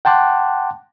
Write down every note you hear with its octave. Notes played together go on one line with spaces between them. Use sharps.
F#5 G5 A5 C6 D6 F#6